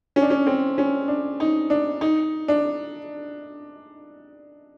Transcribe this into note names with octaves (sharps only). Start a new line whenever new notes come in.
C#4
D4
C#4
C4
C#4
D4
D#4
D4
D#4
D4